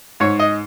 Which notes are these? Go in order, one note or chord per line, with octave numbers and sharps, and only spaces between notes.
G#2 C#5
D#5